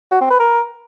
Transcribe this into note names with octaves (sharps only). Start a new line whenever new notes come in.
F#4
C4
B4
A#4